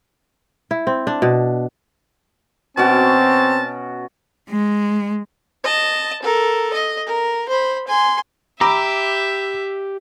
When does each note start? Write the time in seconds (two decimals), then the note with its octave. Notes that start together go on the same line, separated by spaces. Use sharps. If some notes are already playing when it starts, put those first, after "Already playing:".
0.71 E4
0.87 C4
1.07 D4
1.22 B2
2.77 B2 C4 C#4 F#4 A5
4.49 G#3
5.64 D#5 A5
6.22 A4 A#4
6.73 D#5
7.07 A#4
7.48 C5 B5
7.88 G#5 C6
8.61 G4 E5 A#5 B5 D6 E6